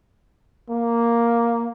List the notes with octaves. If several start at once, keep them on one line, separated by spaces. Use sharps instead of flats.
A#3